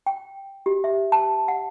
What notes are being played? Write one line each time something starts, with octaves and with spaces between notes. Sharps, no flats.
G5
G4
E5
A5
F#5